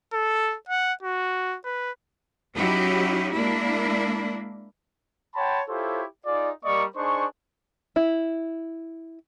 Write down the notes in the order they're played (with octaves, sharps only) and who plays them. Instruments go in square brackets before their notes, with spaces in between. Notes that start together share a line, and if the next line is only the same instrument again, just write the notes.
[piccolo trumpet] A4
F#5
F#4
B4
[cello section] F#3 C#4 D#4 E4 F#4 G4
G#3 A#3 D4 E4
[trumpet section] C#5 F#5 G5 A5 B5 C6
E4 F4 G4 A4 C5 C#5
D#4 F4 G#4 D5
G3 A#3 A#4 D5 D#5 C#6
D4 D#4 G#4 C5 C#6
[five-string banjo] E4